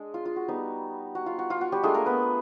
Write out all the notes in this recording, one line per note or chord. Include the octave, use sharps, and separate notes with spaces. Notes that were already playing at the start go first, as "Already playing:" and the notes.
Already playing: G#3 D4 G#4
F4
F4
F#4
G3 B3 D#4
F#4
F4
F#4
F4
F#4
G3 G4
G#3 A3 D4 F4 G#4
A#3 A#4
B3 B4